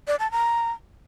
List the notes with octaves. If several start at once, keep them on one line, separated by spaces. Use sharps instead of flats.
D5
A5
A#5